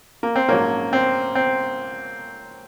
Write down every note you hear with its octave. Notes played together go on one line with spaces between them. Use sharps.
A#3
C4
A#1 G#2 F#3 A#3 C#4
C4
C4